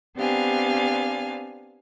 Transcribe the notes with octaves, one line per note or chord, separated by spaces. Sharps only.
B3 C4 D4 G4 F5 G#5